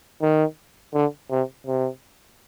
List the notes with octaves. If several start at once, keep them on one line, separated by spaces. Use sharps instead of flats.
D#3
D3
C3
C3